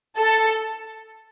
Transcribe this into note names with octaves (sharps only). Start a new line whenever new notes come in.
A4